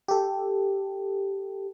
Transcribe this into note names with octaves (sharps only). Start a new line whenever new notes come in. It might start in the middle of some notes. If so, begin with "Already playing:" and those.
G4 A4